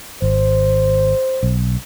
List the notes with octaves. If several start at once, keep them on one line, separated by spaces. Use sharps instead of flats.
G#1 C5
B1